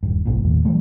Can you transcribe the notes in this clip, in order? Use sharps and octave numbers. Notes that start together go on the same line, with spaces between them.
D#1 G2
F#1 B1 G2 A#2
D#2 A2
E3 F#3 G3 A3